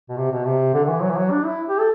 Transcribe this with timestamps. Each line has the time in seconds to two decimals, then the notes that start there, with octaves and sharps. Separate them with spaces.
0.09 B2
0.17 C3
0.32 B2
0.46 C3
0.74 D3
0.84 D3
0.88 E3
1.02 F#3
1.10 E3
1.17 F#3
1.31 D4
1.46 E4
1.69 G4
1.79 A4